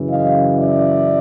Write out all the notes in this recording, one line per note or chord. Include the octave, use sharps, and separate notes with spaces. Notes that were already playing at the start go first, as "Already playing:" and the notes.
Already playing: F#2 C#3 E3
D#5 F5
D5 E5